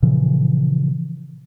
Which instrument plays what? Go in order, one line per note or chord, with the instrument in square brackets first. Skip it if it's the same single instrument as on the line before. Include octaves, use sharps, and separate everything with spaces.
[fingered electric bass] A#2 C#3 E3 F3